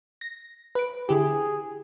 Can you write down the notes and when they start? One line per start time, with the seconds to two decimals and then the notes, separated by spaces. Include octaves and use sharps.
0.21 A#6
0.75 B4 D7
1.09 D3 E4 G4 G#4